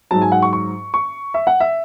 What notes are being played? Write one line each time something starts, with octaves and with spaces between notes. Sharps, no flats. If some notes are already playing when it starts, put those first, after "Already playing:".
G#2 F#3 A5
G#5
F#5
C#6
C#6
C#6
E5
F#5
E5